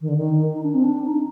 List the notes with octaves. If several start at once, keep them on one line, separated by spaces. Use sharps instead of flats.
D#3
D3
D#3
D#4
D4
C4
D4
D#4